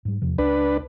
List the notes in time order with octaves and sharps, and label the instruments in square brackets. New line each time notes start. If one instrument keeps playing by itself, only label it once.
[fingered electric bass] G#2 G3
E2 C3 F3
[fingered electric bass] C#2 [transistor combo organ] D4 B4